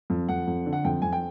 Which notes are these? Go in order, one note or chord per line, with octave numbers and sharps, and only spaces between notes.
F2
F2 F#5
F2
D3
F#5
F2 G5
F2 G#5
G5